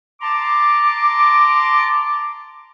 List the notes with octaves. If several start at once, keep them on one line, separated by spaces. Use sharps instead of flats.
A5 A#5 C6 D6